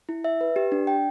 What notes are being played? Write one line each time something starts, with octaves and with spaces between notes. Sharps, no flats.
E4
E5
B4
G4
D4
G5